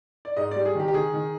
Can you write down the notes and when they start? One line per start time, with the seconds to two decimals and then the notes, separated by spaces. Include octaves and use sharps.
0.25 D5
0.37 G#2 D#5
0.51 G3 D5
0.65 G#4
0.75 D#3 G4
0.88 G4
0.94 D#3 G#4
1.13 D#3